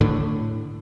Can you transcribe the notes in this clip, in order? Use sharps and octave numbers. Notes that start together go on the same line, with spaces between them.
A2 D3